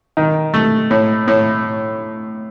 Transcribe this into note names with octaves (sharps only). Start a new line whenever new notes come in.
D#3
A3
A2
A2